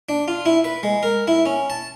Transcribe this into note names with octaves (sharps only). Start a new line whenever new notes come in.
D4
F4
E4
B4
G#3
A#4
E4
C#4
A5